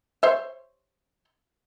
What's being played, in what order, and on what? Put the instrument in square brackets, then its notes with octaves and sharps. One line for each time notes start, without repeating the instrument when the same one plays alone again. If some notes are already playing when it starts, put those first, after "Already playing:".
[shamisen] C5 C#5 E5